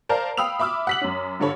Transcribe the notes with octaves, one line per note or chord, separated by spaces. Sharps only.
A#4 C5 D5 F5 A5 A#5
F5 G5 B5 D#6 E6 F7
E5 B5 D6 E6 F6
F#5 B6 F#7
F#2 C#4
G2 D3 A4 C#5 B5